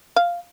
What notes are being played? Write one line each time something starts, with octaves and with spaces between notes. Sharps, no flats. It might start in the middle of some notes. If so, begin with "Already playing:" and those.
F5